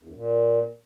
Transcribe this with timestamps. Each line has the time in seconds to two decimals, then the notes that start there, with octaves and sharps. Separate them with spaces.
0.03 E2
0.09 F#2
0.15 A#2